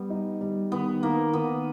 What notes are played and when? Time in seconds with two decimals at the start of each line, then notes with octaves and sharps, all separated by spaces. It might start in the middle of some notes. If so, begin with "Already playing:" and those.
Already playing: G3 B3
0.10 D#4
0.41 G3
0.71 D#3 B3
1.02 D#3 A#3
1.33 D#3 B3